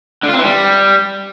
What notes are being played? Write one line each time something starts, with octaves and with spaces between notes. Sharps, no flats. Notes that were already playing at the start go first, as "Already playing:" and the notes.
D3
F4
C4
E3
G3